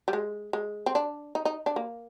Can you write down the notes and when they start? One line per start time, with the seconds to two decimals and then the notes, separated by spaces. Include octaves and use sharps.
0.08 G3
0.13 G#3
0.53 G#3
0.86 C4
0.95 D4
1.35 D#4
1.45 D#4
1.66 D4
1.76 A#3